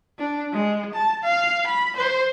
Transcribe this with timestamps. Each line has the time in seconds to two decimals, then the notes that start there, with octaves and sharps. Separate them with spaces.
0.19 D4
0.53 G#3
0.94 A5
1.24 F5
1.67 B5
1.97 C5